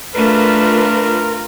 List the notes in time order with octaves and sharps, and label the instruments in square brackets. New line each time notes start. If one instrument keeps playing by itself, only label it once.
[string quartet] A3 D4 [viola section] F4 A#4 [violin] B4